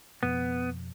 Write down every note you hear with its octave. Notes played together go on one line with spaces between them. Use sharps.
F2 B2 F3 B3